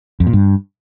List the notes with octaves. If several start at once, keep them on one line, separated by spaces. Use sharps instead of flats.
F2
A#2
G2